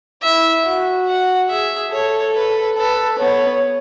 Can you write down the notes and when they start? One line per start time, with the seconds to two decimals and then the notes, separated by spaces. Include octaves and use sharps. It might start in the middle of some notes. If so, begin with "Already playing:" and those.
0.23 E4 E5
0.66 F#4
1.08 F#5
1.50 G#4 E5
1.92 A4 C#5
2.35 B4
2.77 A4 B4
3.19 B3 C#5